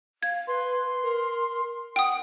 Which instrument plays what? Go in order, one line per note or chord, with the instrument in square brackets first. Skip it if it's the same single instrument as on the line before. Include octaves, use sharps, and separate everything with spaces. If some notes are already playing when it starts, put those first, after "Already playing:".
[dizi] F5 [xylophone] G#6
[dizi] B4 [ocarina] C6
[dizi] A#4
[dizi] F#5 [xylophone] G5 D#6